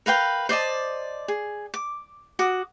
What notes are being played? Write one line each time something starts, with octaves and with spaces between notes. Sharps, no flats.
A#4 B4 F5 G5
C5 D5 D#5 A5
G#4
D6
F#4 D6 D#6